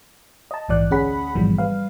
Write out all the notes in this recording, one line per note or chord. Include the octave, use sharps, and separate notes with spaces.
D#5 A5
A#1 G#2 E3 D5 F#6
D2 C#4 G#4 F#5 B5 B6
A1 G#2 B2 E3 F3 G3
G3 B4 F5